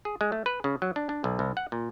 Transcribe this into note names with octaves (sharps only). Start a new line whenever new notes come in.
G#4
G#3
A3
B4
C#3
F#3
D4
D4
B1
C2
F#5
A#2